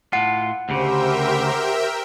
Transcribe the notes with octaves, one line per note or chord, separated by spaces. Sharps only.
A2 F4 F#5
D2 C#3 G4 A#4 C5 E5 G5